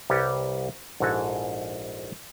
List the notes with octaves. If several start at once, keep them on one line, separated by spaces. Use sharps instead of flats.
C2 G3 G4 B4 C#5
A#1 G#2 E4 F#4 A4 G#5